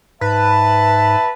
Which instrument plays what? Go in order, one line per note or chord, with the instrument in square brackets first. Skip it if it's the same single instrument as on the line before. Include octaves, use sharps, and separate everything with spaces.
[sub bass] G#2 [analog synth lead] B4 [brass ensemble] E5 A5